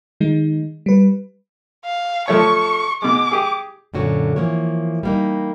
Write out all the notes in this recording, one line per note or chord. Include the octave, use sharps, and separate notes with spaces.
D#3 G#3 D#4
G3 B4
F5
F3 A3 C#5 C#6
B2 G#3 D6
G4 G#4
F#2 A#2 D3 F#4 C#5
E3 F3 A#3 C#5
G3 A#3 D#4